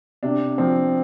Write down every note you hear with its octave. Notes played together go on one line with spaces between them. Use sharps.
C3 D4
F3 C4